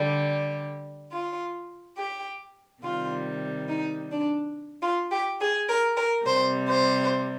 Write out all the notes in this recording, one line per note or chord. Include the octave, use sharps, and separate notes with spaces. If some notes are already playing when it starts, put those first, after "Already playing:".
Already playing: D3 G3
F4
G4
C3 D#3 G3 F4
D#4
D4
F4
G4
G#4
A#4
A#4
C3 G3 C5
C5